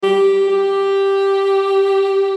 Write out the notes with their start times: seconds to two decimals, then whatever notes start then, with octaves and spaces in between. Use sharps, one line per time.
0.03 G4
0.49 G4